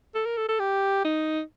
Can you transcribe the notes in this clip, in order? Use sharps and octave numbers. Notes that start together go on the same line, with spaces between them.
A4
A#4
A4
A4
G4
D#4